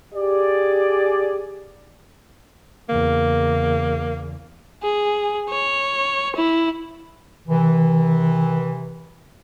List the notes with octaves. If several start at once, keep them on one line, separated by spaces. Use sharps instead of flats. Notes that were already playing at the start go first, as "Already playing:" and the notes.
G4 G#4 D5
E2 C#3 A#3
G#4
C#5
E4
C3 D#3 E3